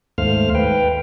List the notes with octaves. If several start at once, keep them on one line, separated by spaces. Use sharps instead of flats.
D#2 G#2 A3 C5 F5 F6
B4 G5